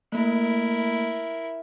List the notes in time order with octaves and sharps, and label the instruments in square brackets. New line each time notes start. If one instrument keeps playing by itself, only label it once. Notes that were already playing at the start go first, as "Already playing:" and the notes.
[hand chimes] A3 A#3 [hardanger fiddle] E4 A#4